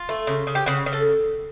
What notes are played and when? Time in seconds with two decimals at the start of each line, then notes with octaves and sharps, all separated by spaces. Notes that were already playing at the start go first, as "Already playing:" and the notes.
Already playing: F4
0.09 A3
0.27 C#3
0.47 C#3
0.55 G4
0.66 C#3 F#4
0.86 C#3
0.93 A4